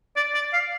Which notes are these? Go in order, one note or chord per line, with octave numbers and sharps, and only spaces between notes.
D5
D5
F5